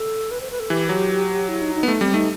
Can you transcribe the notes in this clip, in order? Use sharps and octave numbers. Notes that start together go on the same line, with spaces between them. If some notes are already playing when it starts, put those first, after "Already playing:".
Already playing: A4
B4
C5
B4
A4
E3 G4
F#3
E4
D#4
D#4
B3
A3 D#4
G3 C4
A3 D#4